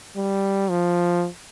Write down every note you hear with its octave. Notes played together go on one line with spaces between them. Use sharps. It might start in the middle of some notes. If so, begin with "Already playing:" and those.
G3
F3